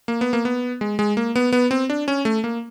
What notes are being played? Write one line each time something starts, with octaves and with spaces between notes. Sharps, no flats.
A#3
B3
A#3
B3
G#3
G#3
A#3
B3
B3
C4
D4
C#4
A3
A#3